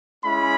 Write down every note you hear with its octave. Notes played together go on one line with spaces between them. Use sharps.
G#3 C#4 E4 B5